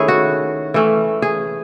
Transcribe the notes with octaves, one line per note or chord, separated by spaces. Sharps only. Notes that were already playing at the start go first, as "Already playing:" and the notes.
Already playing: D#3 A3 C#4 E4 G#4 C#5
F#4
E3 A3 C#4
G#4